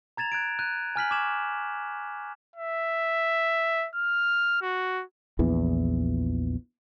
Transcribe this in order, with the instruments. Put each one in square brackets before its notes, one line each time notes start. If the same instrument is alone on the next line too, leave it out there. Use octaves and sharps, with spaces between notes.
[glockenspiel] A#5 G#6 A6 E7 F7
F#6 G#6 D7
F#6 G6 D#7
G#5 F6 B6 F#7
C#6 D6 F6 G#6 E7 F#7
[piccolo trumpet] E5
F6
F#4
[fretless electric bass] A#1 E2 E3